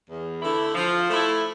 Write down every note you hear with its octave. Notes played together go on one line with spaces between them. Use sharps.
E2
D3 A3 E4
F3
A3 E4